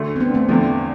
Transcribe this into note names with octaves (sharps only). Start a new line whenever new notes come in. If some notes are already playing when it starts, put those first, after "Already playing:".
Already playing: D2 D3 A3
C4
B3 D4
A3 C4
E2 D3 F3 A3